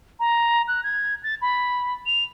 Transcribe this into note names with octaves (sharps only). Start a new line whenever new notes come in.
A#5
F#6
G#6
A6
B5
F7